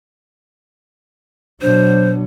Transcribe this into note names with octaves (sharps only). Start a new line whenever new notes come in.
B2 F#3 D4 C5